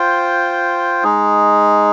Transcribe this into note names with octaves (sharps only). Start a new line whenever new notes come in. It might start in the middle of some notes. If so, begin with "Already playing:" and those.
Already playing: F4 C5 G5
G#3 D#4 G#4